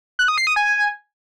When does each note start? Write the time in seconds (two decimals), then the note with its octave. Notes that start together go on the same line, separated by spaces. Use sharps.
0.19 F#6
0.28 D#6
0.38 C7
0.47 D#6
0.56 G#5